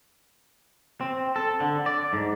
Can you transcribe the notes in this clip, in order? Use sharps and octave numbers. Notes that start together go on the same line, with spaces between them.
C4
A4
D3
D5
G#2